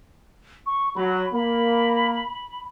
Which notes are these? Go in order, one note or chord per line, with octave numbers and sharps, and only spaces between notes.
C#6
F#3 B5
A#3 B5